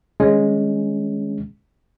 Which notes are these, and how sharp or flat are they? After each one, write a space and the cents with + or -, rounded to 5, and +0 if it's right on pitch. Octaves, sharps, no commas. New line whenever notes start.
D#3 +0 G#3 +0 C#4 +0